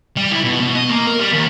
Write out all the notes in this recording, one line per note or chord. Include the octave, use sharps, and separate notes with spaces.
G3
E4
B2
B2
D#5
A#3
A#4
G3
D#2